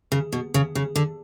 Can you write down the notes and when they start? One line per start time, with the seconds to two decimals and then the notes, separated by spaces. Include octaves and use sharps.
0.12 C#3
0.32 B2
0.54 C#3
0.75 C#3
0.96 D3